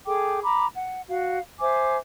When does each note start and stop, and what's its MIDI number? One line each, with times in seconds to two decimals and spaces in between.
0.06 0.41 68
0.06 0.41 69
0.06 0.41 79
0.06 0.41 86
0.43 0.66 82
0.43 0.66 83
0.43 0.66 86
0.74 1.01 78
1.08 1.39 66
1.08 1.39 77
1.60 1.97 72
1.60 1.97 76
1.60 1.97 80
1.60 1.97 86